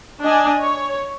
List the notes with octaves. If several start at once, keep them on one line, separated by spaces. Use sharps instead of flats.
D4 D#5 G#5
C#5